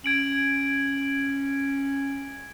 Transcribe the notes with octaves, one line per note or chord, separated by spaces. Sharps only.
C#4 G#6 D7 F#7